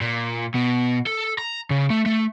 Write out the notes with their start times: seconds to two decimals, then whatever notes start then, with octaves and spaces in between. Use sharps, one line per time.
0.01 A#2
0.55 B2
1.06 A4
1.38 A#5
1.70 C#3
1.90 A3
2.06 A3